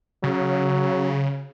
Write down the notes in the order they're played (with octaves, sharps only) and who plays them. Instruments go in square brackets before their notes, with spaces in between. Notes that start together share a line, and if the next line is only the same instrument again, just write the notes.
[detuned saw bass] C#3 [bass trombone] F#3